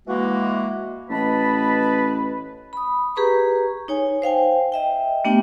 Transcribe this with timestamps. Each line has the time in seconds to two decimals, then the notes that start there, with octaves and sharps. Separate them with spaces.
0.07 E3 G#3 A#3 F#4
1.10 A1 B4 D#5 A5 B5
2.73 B5 D#6
3.16 G4 G#4 B4 A#5 C#6
3.88 D#4 C#5 G#5
4.22 C5 F5 G5 G#5
4.72 D#5 E5 G5
5.24 A3 B3 D4 G4 G5